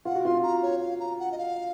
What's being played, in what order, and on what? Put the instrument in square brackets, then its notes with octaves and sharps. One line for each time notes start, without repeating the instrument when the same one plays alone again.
[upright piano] F4 [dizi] F#5
[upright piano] F#4
[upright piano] F4 [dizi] C6
[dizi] A#5
C#5
F5
A#5
F#5
D#5
F5